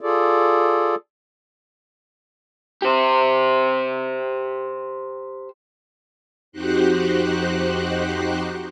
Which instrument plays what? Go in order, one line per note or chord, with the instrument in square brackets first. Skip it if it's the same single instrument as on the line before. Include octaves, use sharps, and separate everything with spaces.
[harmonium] F4 G#4 A4 D5
[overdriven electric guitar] G4 C5
[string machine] F2 D#4 F#4 G4 C5 F#6